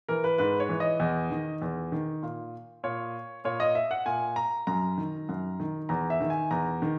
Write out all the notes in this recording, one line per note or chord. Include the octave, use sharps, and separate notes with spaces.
E3 A#4
B4
G#2 B4
C#5
E3
D#5
E2
D#3
E2
D#3
A#2
A#2 C#5
A#2 C#5
D#5
E5
F#5
A#2 G#5
A#5
F#2 A#5
D#3
F#2
D#3
E2 A#5
E5
D#3
G#5
E2 A#5
D#3